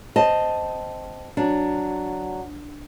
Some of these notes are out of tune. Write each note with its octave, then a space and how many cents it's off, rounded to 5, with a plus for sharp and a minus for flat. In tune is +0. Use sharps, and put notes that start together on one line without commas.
C4 -5 D#5 +0 A5 +0
F#3 +0 D4 +0